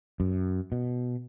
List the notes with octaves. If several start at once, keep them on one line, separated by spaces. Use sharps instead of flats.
F#2
B2